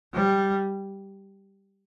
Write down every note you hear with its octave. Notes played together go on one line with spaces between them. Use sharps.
G3